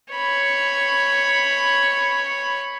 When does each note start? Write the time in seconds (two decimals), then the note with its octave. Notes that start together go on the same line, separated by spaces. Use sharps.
0.14 C#5 B5